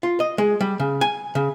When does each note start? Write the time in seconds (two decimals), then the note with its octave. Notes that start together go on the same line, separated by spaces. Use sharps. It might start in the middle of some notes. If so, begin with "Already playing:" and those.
0.03 F4
0.20 D#5
0.38 G#3
0.61 G3
0.80 C#3
1.01 G#5
1.35 C#3